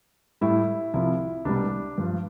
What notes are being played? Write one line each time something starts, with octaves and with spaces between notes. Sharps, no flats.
A2 G3 E4
C2 C3 F3 E4
C2 B2 G3 D4
G2 F3